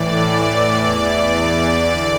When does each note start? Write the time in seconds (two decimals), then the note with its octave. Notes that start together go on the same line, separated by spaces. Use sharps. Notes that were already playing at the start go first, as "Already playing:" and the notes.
Already playing: A2 E3 D5
0.75 E2 E3 D5
1.88 D3